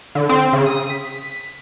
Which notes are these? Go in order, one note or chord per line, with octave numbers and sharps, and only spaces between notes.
D3
C4
C#3
D#6
B6